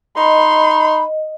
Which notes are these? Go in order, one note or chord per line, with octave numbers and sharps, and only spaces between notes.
D#4 D#5 B5 C6